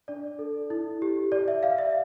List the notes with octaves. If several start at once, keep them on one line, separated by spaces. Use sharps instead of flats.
D4 D5
A4
E4
G4
D5
E5
D5 F5
E5